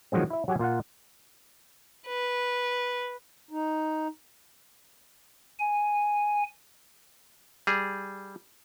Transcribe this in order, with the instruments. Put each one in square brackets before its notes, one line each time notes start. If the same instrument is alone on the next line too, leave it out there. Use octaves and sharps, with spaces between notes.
[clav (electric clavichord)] D#3 F3 F#3 G#3 C4
E4 E5
F#3 G4 F#5 G#5
A#2 F4 F5 F#5
[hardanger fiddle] B4
[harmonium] D#4
[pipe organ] G#5
[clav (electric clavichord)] G3 G#4